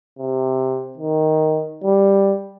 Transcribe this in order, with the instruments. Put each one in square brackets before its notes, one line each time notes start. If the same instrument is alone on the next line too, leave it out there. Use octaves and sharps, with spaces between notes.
[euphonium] C3
D#3
G3